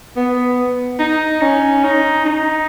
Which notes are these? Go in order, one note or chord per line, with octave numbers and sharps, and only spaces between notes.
B3
D#4
C#4
D#4
D#4